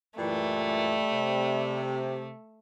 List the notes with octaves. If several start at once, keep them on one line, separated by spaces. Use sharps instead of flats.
F#2 A#2 E3 G3 A3
C3